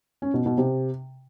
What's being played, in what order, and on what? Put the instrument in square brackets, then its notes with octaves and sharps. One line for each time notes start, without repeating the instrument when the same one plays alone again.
[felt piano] C#4
B2
B2
C3